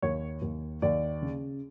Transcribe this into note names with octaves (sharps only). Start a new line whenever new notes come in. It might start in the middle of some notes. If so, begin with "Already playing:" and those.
D#2 C#5
D#2
D#2 D5
C#3